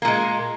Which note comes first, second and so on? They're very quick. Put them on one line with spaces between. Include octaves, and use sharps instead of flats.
A#3 A#2 G#3